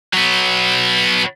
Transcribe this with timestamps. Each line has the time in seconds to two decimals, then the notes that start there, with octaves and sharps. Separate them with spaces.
0.14 F#3 B3